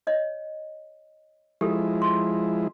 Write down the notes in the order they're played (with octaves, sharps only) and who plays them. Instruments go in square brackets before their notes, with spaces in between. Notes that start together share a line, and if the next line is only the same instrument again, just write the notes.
[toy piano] C#5 D#5
[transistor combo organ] F3 G#3 E4 [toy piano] G4 A4
[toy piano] C6